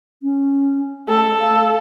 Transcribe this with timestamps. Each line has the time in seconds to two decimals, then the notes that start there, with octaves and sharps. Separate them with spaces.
0.23 C#4
1.08 A3 A4
1.40 F5